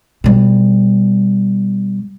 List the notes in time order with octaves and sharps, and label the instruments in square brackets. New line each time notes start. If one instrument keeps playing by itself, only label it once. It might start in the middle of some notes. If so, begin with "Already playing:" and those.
[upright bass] B2 G3